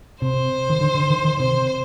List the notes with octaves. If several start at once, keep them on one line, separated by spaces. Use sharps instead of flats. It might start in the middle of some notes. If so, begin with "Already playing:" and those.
C3 C5
D#3
D3
D3
D#3
D#3
C3 C5